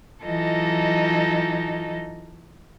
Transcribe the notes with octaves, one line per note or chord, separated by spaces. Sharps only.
E3 F#3 D#4 F4 A4 D#5